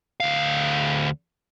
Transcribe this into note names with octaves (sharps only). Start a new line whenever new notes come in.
D2 F5